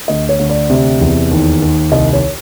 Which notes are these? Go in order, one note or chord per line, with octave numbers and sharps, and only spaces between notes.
D2 D#5
C#5
D2
D5
C3
E2
D#2
D#2
C2 D#5
C#5